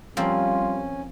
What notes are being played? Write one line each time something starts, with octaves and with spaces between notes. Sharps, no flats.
F3 G3 A#3 C4 C#4 F4